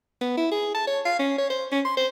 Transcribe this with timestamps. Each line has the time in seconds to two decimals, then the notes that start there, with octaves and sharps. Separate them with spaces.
0.21 B3
0.37 E4
0.52 G#4
0.74 A5
0.87 C#5
1.05 F5
1.19 C#4
1.38 C#5
1.50 C5
1.72 C#4
1.85 C6
1.97 C5